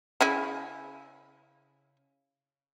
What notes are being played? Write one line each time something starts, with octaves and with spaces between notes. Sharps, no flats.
C#3 E4 G#5